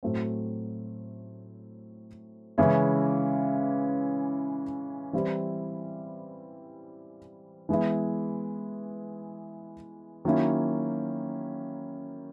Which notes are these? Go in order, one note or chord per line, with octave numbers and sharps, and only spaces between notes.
A2 F#3 A3 C4
C#3 E3 G#3 C#4 E4
E3 G3 C4 E4
E3 G#3 B3 E4
D#3 F#3 A#3 C#4 E4